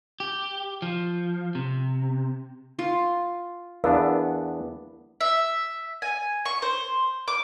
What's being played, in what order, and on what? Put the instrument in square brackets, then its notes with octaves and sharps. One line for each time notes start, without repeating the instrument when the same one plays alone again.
[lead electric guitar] G4
F3
C3
[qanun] F4
[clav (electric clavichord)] E2 B3 D4 [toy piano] A#4 F5
[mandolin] E5
G#5
C#6
C5
D6